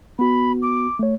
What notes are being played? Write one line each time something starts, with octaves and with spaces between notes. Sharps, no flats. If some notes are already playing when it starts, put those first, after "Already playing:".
B3 F#4 B5
D6
A3 C#5